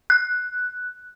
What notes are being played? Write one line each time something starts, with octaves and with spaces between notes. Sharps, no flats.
F#6